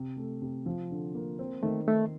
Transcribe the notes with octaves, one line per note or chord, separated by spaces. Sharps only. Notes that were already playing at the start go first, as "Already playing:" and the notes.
Already playing: C3
A3
C3
F3
D3
A#3
C4
D#3 A3
D#3 A3